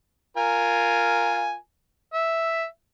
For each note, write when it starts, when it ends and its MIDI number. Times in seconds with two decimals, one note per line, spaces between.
0.37 1.55 65
0.37 1.55 70
0.37 1.55 80
2.14 2.66 76